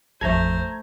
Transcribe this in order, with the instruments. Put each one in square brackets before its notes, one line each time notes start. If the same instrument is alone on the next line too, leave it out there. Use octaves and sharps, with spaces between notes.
[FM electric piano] A1 F2 [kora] A3 A4 [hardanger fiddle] C5 [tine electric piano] A#5 G#6